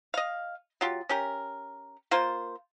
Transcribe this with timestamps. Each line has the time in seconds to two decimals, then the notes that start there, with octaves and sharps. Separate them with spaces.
0.14 D#5 F5
0.81 F#3 F4 G4
1.09 C#4 G4 A#4
2.11 A#3 F4 A#4 C5